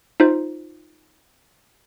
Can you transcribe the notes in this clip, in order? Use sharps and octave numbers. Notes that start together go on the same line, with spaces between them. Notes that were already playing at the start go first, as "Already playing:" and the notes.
D#4 F4 C5